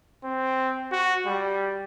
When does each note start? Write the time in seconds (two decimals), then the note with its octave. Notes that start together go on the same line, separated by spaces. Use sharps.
0.24 C4
0.91 F#4
1.26 G3